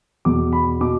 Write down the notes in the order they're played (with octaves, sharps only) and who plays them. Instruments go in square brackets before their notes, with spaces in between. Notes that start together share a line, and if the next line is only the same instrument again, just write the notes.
[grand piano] E2 B2 D6
B5
B2 D6